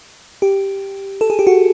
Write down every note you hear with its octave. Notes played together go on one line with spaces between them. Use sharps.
G4
A4
G#4
G4
F#4